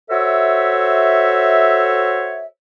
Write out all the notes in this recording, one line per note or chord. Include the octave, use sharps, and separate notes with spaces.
F#4 A4 C5 C#5 E5